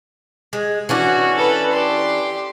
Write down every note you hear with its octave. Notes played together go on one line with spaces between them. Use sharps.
G#3
E3 C#4 D4 F#4
A4 B4
G4 C6